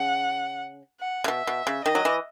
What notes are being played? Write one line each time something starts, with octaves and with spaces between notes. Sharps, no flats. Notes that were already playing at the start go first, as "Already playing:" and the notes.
Already playing: C#3 F#5
F#5
C#3
B2 E5
B2
C#3
D#3 D#5
F#3
E3